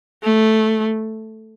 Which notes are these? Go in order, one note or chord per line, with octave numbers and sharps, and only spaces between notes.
A3